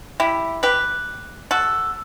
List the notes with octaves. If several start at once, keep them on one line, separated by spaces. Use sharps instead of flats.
E4 G4
G4 B4
F#4 A4